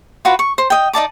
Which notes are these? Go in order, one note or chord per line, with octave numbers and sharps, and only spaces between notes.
F4 F#4 B4
C#6
C5
D#5 G5
D#4 D5 A5 D6